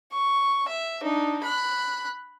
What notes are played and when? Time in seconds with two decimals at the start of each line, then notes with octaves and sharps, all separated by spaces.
0.12 C#6
0.68 E5
1.02 D4 D#4
1.44 B5 F#6